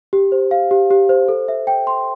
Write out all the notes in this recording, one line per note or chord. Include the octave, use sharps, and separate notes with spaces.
G4
C5
F5
G4
G4
C5
A4
E5
G5
C6